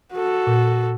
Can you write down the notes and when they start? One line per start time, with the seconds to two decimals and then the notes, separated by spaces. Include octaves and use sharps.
0.14 F#4 A4
0.47 A#2